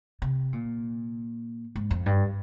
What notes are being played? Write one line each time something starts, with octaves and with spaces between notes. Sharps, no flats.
C3
A#2
G#2
F2
G2